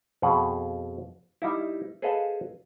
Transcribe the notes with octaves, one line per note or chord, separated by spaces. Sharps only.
F2 B2 G#4 F#5
G3 D#4 E4
G#4 A4 B4 C5 D#5 F5